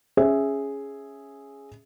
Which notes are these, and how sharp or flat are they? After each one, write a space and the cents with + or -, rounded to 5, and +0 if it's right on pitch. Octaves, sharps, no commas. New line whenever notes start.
C#4 +0 G#4 +0 E5 +0